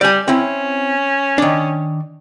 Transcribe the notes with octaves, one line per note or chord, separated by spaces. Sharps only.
G3 D5 G#5
C4 C#4 E4
D#3 D4